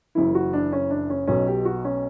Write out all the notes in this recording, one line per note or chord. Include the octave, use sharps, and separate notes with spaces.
F#1 F#2 E3 E4
F#4
D4
C#4
D4
C#4
B1 B2 C#4
G4
F#4
C#4